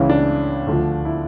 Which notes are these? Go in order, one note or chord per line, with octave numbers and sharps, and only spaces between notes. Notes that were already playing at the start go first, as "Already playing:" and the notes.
Already playing: C#2 C#3 E3 C#4
D4
D2 D3 F3
E4